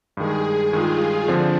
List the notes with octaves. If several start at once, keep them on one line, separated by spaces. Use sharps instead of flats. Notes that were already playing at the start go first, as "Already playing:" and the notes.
G2 D#3 G#3 G#4
G2 D#3 G#3 F4
D3 F3 C4 D4